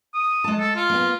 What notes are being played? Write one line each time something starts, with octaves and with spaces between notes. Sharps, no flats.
D#6
G#3 A5
A4
F4
A#3 B3